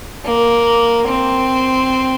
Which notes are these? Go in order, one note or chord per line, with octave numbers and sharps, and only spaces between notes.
A#3
C4